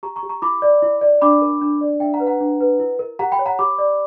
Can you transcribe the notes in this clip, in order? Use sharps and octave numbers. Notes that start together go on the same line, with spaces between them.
G4 A#5 C#6
A#5 C#6
G4
A#5 C#6
E4 B5 D6
D5
E4
D5
D4 B5 D6
A#4
D4
D5
D4 E5 G5
F#5 A#5
B4
F#5 A#5
D4
B4
E4
A#4
G4 F#5 A#5
G5 B5
C#5
F#5 A#5
G4 B5 D6
D5